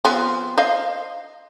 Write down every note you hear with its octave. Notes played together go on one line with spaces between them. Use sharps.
F3 B3 C4
C5 D#5 F5